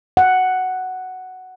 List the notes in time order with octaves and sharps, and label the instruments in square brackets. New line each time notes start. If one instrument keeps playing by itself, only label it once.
[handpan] F#5